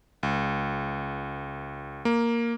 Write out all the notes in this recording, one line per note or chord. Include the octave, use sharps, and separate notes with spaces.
C#2
A#3